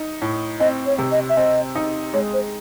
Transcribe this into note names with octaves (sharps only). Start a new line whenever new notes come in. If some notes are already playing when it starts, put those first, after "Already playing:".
Already playing: D#4
A2
C4 D#5
C#5
C3
D#5
E5
C4 D#5
D#4
G#3 C#5
C5